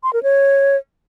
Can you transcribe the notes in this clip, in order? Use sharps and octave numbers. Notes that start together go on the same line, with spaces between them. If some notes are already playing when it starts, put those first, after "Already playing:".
C6
A#4
C#5